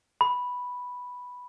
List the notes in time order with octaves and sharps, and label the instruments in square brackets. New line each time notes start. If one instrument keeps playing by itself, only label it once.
[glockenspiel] B5